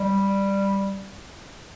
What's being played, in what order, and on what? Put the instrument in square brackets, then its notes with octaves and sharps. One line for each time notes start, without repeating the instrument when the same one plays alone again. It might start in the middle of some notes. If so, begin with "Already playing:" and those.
Already playing: [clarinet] G3